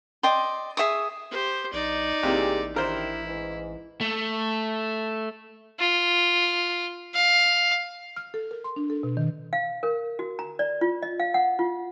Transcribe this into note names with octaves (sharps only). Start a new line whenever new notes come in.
D5 D#5 G5 C6
G#4 E5 C#6 D#6
G4 C5
A#1 D#4 D5
A1 C3 E3 A#3 G4 G#4
D#3 D4 E4 A#4 C5
G#2 E3
A3
F4
F5
F6
A4
A#4
C6
D4
A4
B2
D#3
F5
A#4
F#4
A#5
D5
F4
D#5
F5
F#5
F4